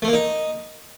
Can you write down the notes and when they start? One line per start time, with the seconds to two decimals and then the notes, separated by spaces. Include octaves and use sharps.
0.02 A3
0.08 A#3
0.13 D#4